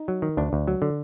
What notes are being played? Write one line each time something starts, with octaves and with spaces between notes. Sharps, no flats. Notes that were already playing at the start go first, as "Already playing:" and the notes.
Already playing: D#4
F#3
D#3
D2 D4
D2
F#3
D3